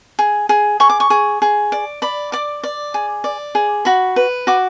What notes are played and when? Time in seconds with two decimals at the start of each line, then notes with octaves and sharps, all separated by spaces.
0.19 G#4
0.49 G#4
0.80 G#4 C#6
0.90 D6
1.00 C#6
1.10 G#4
1.42 G#4
1.72 D5
2.02 D5 B5
2.32 D5 D6
2.64 D5
2.94 G#4
3.24 D5
3.55 G#4
3.85 F#4 B5
4.16 B4
4.47 F#4 D6